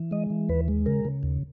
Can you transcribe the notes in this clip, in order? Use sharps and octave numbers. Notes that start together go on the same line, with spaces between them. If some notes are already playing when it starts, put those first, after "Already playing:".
Already playing: E3
G#3 D#5
E3
D#2 B4
G#3
C#3 A#4
C#3
D#2